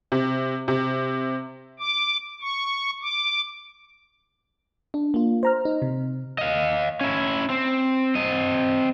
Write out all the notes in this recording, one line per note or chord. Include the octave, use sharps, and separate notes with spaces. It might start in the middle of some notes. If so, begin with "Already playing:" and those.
C3
C3
D6
C#6
D6
D4
A#3 F4
C5 A#5 F6
D#4
C3
D#5 F5
C#4 E4
C4
C4 D#5